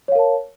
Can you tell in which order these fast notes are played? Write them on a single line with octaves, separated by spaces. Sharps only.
C#5 F5 A#4 A5